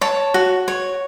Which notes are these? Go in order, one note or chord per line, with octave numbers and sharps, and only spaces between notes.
C#5 A5
F#4
C#5